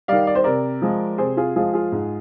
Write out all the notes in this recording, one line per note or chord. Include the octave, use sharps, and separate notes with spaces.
D#3 G3 D5 F5
D5
C5
C3 A#4 D5
F3 G#3
C3 G#4 C5
F4 G#4
F3 G#3 F4 G#4
F4 G#4
G#2